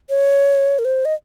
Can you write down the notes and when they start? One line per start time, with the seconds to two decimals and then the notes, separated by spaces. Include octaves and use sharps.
0.10 C#5
0.79 A#4
0.85 C5
1.05 D#5